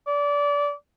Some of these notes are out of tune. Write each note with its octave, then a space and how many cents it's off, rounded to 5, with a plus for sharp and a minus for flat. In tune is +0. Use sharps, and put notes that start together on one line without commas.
D5 -25